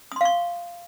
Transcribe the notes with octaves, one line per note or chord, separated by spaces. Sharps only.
F5 C6 C#6 D#6